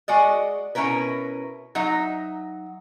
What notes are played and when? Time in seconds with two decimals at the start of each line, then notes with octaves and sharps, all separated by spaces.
0.08 G#3 F#4 D5 D#5
0.75 B2 C#4 E4 A#4 B4
1.75 F#3 D#4 E5